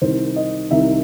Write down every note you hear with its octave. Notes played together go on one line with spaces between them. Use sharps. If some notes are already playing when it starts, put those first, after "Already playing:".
C2 C3 D#3 C5
D#5
C2 C3 D#3 E5